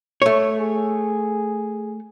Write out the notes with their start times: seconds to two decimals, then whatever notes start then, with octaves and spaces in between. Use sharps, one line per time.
0.22 A3 C#5
0.58 G#4